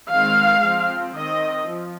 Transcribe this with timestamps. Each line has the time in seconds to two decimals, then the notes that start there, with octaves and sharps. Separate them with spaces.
0.11 D#3 G#3 C4 F5
0.64 F3 C4
1.16 D#3 C4 D#5
1.69 F3